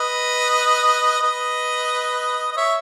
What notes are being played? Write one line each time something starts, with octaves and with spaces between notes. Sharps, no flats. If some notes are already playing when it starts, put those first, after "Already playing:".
Already playing: B4 D#5
B4 D#5
D#5
C#5 E5